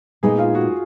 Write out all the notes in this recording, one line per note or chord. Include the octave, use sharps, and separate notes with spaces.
A#2 G#3 B3 D#4 G#4
F4
F#4